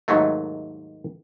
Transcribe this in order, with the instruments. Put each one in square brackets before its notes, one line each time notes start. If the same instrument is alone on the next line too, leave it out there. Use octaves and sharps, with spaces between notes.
[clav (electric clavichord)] D#2 G#2 D#3 F#3 A3